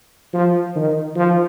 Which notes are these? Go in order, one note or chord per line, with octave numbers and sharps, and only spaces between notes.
F3
D#3
F3